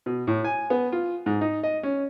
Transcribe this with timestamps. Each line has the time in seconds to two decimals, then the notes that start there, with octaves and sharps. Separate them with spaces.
0.06 B2
0.27 A2
0.44 G#5
0.70 B3
0.92 F4
1.26 G#2
1.41 D#4
1.63 D#5
1.83 C#4